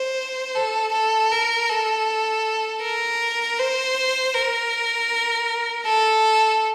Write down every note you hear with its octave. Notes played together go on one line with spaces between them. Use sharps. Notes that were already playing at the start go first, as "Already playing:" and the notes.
Already playing: C5
A4
A4
A#4
A4
A#4
C5
A#4
A4